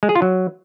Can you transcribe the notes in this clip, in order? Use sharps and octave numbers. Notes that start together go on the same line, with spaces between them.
G#3
G#4
F4
F#3